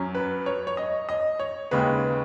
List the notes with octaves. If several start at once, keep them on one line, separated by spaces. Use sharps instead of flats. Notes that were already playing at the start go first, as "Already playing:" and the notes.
Already playing: F#2 F#3 C#4
B4
C#5
C#5
D#5
D#5
C#5
D#2 C#3 G#3 B4